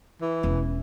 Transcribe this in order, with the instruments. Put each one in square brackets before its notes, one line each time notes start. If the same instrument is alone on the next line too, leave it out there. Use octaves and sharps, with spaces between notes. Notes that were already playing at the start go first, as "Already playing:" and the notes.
[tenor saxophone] E3
[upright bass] E1 C#4